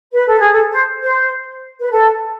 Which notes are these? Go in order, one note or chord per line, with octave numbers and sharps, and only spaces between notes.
B4
A4
G#4
A4
C5
C5
B4
A4